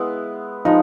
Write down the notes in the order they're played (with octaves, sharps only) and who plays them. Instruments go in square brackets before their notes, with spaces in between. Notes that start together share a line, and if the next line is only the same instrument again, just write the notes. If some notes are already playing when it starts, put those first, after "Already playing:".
Already playing: [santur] G#3 B3 E4
[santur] F3 G#3 [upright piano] D#4